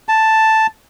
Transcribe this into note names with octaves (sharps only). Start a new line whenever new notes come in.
A5